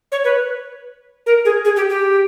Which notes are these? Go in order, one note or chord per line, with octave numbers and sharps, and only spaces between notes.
C#5
B4
A#4
G#4
G#4
G4
G4